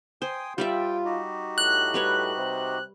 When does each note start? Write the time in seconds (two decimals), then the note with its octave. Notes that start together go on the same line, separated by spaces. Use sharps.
0.22 C5 G5 G#5 D#6
0.58 G3 F4 D5 E5 G5
1.05 D#4 F#4 G4
1.58 A2 F#6
1.94 G3 B4 C#5
2.37 C3